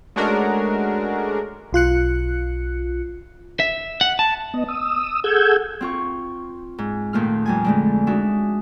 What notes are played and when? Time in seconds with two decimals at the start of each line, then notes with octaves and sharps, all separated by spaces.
0.16 G#3 A3 C#4 D4 F#4 A#4
1.73 B1 F4 F#6 C#7
3.60 E5
4.01 F#5
4.19 A5
4.54 B3 D#5
4.68 D#6 E6
5.24 G#4 A4 F#5 E6 G6 G#6
5.81 C4 F4 C#6
6.78 G#2
7.13 D#2 A#2 A3 F4 F6
7.46 F2 G3 G#5
7.64 D3 G#3 A3
8.07 G#3 D4 D#4 F#4 E5